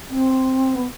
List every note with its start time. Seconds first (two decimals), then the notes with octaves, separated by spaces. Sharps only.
0.10 C4
0.75 B3